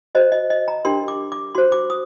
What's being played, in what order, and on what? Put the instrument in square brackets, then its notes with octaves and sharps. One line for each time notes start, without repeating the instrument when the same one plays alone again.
[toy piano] F#4 C5 D#5
D#5
D#5
A#5
D4 G4 A#4 C6
D6
D6
F#4 C5 C6
D6
D#6